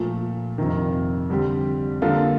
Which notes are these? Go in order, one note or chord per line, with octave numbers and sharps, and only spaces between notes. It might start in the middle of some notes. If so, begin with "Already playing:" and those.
Already playing: A#2 F3 A3
F2 C3 D#3
D3 G3 C4 G4
D3 G3 A#3 F4 A4